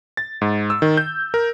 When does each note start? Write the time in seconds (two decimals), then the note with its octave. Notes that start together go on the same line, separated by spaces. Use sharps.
0.17 A6
0.42 G#2
0.70 E6
0.82 D#3
0.97 G6
1.34 A#4